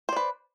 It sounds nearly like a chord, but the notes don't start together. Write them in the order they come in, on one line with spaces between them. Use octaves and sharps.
C5 D5 B4